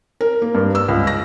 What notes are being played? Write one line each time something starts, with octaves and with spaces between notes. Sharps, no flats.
A#4
A#3
G2
E6
C#2
A#6